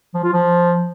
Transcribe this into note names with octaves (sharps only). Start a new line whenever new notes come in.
F3
F4
F3